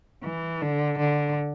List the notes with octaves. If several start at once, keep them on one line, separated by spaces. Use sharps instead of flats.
E3
D3
D3